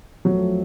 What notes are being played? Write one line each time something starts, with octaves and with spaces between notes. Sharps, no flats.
F2 F3 F#3 A3